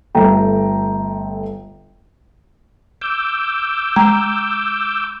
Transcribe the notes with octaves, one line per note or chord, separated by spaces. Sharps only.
G1 A3 G5 A#5
D6 E6 G6
G#3 A#5